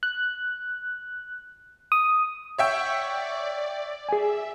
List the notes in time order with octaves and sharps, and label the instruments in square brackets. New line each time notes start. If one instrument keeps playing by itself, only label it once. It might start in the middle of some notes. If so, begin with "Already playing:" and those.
[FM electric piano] F#6
D#6
[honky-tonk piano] C#5 E5 G5 [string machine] F#5 C#6 B6
[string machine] D5
[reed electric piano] G#4 G#5 [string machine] E5